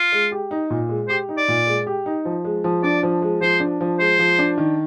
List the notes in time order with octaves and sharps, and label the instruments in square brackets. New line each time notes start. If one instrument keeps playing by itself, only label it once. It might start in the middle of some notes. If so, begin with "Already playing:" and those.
Already playing: [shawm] F4
[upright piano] G#3
G4
D#4
A#2
G#3
[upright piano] G4 [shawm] C5
[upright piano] D#4
[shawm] D5
[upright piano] A#2
G#3
G4
D#4
F3
G#3
F3
[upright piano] D4 [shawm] D5
[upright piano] F3
G#3
[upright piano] F3 [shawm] C5
[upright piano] D4
F3
[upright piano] G#3 [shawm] C5
[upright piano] F3
D4
D#3